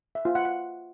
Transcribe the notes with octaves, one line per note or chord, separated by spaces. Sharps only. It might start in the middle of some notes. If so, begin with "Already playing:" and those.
E5
F4
F#5
F#5